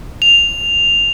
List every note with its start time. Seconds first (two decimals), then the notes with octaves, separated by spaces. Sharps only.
0.22 F7